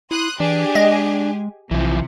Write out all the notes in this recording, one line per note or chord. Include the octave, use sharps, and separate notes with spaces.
E4 C6 D#6 F#6
E3 D4 G4 G#4 G#5
G#3 D#5
B1 C3 E3 F3